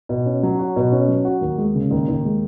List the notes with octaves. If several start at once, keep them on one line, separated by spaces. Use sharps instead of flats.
B2
C#4
F#3
F#4
B2
C#4
F#3
F#4
D#2
G#3
C#3
D#2
D#2
G#3